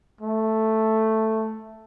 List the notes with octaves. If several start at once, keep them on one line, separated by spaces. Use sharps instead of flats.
A3